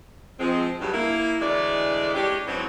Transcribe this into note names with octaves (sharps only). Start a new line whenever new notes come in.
F3 G#3 C4
G2 C#3 F#3
A#3 E4
D2 E3 G#3 A3 D5
G#3 C#4 D4 G4
G#2 B2 F#3 C4 C#4 E4